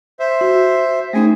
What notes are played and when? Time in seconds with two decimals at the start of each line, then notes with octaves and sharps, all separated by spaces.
0.20 C5 E5
0.41 F#4
1.13 A3 C#4 D#4 G#4 G#5